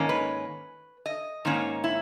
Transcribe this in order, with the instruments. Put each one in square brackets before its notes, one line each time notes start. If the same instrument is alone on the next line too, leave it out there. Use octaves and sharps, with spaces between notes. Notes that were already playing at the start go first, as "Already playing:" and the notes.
Already playing: [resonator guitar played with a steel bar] G#2 D#3 A#3 C#4
B4
D#5
G#2 D#3 A#3 C#4
E4